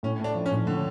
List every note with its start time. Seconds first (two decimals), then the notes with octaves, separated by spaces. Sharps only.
0.03 A2 C#4
0.20 A3 D4
0.35 F3
0.46 C#4
0.52 A2
0.67 A2 D3